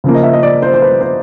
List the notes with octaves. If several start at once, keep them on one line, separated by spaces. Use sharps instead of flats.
C#3 F3 A#3
D#5
E5
D#5
D5
C5
C5
B4
C5